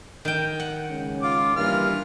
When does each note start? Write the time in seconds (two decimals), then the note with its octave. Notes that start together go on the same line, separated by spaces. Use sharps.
0.25 D#3 G5
0.60 F#5
0.90 C#3 G#3 C#4
1.22 F4 D6
1.56 G2 E3 A#3 F4 F6